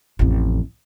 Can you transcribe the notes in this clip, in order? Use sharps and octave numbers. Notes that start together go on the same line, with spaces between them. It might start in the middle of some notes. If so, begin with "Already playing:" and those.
A1 F2